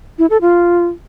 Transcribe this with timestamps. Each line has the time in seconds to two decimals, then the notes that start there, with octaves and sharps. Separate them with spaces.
0.18 E4
0.30 A4
0.41 F4